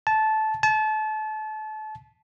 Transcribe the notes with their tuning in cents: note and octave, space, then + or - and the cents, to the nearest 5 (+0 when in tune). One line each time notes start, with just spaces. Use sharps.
A5 -15
A5 -30